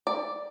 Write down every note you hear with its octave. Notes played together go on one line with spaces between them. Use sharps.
D5